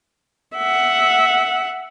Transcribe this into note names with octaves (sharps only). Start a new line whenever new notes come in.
E5 F#5